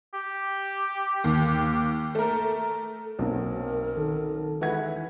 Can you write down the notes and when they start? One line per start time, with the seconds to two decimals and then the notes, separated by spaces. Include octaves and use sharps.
0.14 G4
1.24 D#2
2.15 A3 A#4
3.19 B1 A#3 C4 C#4 A#4
3.97 D#3 A4
4.61 E3 G#3 E4 B4 F#5 G#6